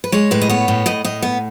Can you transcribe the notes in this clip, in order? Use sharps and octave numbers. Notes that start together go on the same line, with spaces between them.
B4
G#3 C#5
A2 B4
D#5
B3 C#5
A2
A2 D#5
A2 D#5
B3